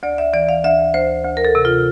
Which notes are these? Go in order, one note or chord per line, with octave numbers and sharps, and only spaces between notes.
D2 D5
E5
E3 D5
F5
D2 E5
D2 C5
D2
A#4
A4
C3
F4